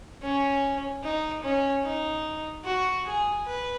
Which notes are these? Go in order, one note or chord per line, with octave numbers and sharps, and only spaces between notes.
C#4
D#4
C#4
D#4
F#4
G#4
B4